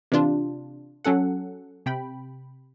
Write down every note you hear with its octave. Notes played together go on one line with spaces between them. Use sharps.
C3 E3 D4 F4
F#3 C#4 A4 F#5
C3 G5 B5